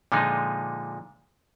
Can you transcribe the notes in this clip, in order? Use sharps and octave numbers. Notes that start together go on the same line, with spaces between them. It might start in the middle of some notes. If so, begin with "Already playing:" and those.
A#2 D3 F3 G#3 D#4